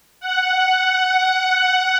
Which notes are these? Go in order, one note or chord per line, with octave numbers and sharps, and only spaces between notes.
F#5
F#5